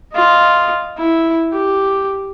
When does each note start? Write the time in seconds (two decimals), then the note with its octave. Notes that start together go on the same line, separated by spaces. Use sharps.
0.13 F4 D#5
0.98 E4
1.53 G4